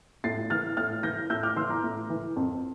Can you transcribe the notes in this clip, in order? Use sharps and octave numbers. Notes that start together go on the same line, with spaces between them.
A2 A6 C7
E3 F6 A6
A2 F6 A6
E3 G6 A#6
A2 E6 G6
D6 F6
E3 C6 E6
A#5 D6
A2
E3
F2